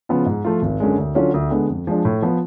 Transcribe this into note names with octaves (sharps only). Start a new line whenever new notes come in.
C#3 F3 B3 F4
G#2
F3 A3 F4
G#1
F#2 D3 G#3
D2
D3 F#3 C#4 F4
D2
D3 G#3 B3
F2
F3 G#3 D4
A2
F3 B3